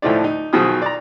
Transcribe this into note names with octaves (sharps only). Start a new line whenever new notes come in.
D2 A2 F3 A3 D#4 D5
D#4
B1 B2 D#3 F3 G#4 D#6
D5 A#5